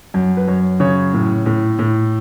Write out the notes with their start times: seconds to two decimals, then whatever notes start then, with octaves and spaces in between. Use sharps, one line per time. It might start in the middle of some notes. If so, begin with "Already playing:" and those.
0.14 F#2
0.37 B4
0.48 F#2 C#5
0.80 C#3 C#5
1.13 A2
1.46 A2
1.79 A2